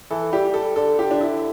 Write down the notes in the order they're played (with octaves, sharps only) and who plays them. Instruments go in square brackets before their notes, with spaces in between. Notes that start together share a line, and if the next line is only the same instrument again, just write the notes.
[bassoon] E3 [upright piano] A4
[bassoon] G3 [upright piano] G4
[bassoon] G3 [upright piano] A4
[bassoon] D3 [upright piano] A4
[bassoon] D3 [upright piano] G4
[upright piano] D4
E4